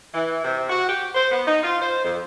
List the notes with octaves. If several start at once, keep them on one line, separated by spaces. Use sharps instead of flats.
E3
C3
F#4
G4
C5
B3
D#4
F4
C5
F2